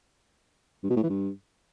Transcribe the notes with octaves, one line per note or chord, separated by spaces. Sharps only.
G2
B2
A2
E3
G2